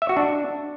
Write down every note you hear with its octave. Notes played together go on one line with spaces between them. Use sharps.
E5
F#4
D4